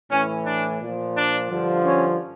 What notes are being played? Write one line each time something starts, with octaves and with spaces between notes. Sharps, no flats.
A2 E3 C#4
D4
A#2 F3
D4
G2 D3 F3
C#4